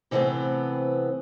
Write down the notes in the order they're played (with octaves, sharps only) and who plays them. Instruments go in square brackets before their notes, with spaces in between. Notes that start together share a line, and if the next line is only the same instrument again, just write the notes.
[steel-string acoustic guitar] C3 E3 G3 A3 B3 C4